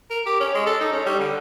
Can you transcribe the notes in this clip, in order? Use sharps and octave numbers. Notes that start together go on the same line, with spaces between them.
A#4
G4
C#4
G#3
A4
D#4
C#4
G3
D3